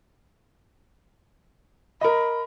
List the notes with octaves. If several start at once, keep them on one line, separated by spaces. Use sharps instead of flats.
A#4 D#5 B5